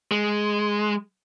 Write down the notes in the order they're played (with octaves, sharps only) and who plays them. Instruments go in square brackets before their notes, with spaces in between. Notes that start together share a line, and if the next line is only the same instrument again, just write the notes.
[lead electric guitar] G#3